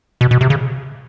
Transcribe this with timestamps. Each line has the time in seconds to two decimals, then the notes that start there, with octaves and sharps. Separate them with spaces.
0.21 B2
0.31 B2
0.41 C3
0.50 C#3